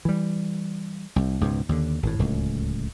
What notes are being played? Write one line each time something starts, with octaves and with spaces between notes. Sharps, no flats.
E3 G3
C2
C#2 G#2 B2
D#2 D3
G#1 A2
D1 C#2